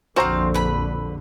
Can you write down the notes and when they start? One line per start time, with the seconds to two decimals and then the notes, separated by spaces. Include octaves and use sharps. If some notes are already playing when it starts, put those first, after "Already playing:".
0.16 A#1 F2 D3 C4 F#4 C5 F5 A#5
0.54 B4 B5